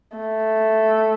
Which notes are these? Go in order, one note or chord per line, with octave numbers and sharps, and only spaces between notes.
A3